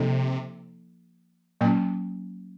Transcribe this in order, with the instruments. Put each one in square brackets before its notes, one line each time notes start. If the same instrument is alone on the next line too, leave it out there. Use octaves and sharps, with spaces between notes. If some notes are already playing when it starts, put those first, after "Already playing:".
Already playing: [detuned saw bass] C3 [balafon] F3 A#3 D#4 A4
[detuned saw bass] A#2 [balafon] F#3 A#3 C#4